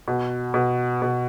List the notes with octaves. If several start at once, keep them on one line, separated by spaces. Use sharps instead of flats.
B2
B2
B2